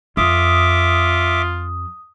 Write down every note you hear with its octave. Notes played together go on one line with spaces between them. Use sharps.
F2 F4 E5 D6 D#6